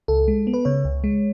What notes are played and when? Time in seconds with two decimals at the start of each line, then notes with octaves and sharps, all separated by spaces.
0.08 C#2 A4
0.28 G#3
0.47 B3
0.54 B4
0.65 C#3 C#5
0.85 C#2
1.04 G#3